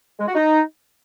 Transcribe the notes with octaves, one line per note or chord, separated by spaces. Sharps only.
G#3
F#4
D#4